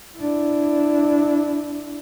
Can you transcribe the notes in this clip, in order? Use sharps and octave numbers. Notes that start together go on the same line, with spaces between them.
D4 E4